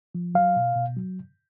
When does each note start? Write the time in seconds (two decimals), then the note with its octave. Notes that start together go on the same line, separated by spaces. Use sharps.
0.15 F3
0.35 F#3 F5
0.56 B2
0.76 B2
0.96 F#3